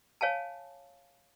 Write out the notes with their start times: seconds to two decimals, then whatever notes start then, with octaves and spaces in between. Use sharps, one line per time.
0.21 C#5 F5 G#5 A5